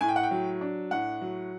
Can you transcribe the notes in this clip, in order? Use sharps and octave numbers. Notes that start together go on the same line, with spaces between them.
A2 G#5
G5
F#5
G5
F#3
D4
A2 F#5
F#3